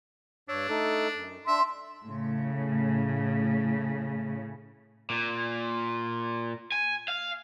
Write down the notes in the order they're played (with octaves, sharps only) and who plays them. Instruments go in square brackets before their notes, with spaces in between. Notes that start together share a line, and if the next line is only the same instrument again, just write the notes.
[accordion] G2 C#5 E6 [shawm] D4
[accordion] A3 D#4 A4
F#2
[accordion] D4 [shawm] E5 [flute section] C6
[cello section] A2 C#3
[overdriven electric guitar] A#2
G#5
F5